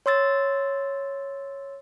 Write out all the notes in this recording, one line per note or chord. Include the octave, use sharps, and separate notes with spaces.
C#5 C6 E6 A6